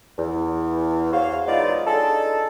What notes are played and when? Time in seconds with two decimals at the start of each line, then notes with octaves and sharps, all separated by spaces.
0.18 E2
1.12 F#4 C5 C#5 F5
1.48 F#3 G#3 B3 D#4 F4 D5
1.87 D4 D#4 G#4 A4